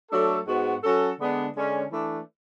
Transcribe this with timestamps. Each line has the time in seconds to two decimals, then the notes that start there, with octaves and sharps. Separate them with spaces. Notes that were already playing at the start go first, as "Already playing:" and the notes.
0.11 F#3 A3 D4 A4
0.47 G#2 G#3 B3 F#4
0.83 F#3 C#4 F#4 A4
1.19 D3 G#3 B3 D4
1.54 D3 G#3 C#4
1.91 E3 A3 D4